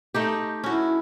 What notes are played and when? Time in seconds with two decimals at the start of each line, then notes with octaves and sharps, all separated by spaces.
0.14 A3 D#4 G4
0.64 C#4 E4 F#4